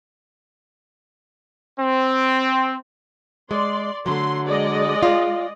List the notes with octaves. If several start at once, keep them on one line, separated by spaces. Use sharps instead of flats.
C4
G#3 D5 C6
D3 F#3 A3 C6
G#3 D5 D#5
F4